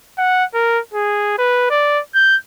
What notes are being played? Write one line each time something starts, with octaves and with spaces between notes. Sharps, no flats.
F#5
A#4
G#4
B4
D5
G6